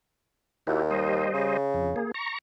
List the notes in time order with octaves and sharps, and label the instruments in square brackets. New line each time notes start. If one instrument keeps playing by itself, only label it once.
[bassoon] D#2 [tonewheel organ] E4 F#4 G4
[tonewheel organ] G3 C5 D#5
[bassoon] C#3
[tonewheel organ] F2
A#3 G#4
A#5 C#6